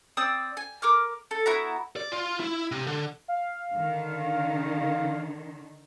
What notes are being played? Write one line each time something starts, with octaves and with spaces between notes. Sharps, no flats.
C4 D5 D#6 E6
G#5
A#4 D6 F6
A4
B3 E4 F#4 A#5
D5
F4
E4
C3
D3
F5
D3 D#3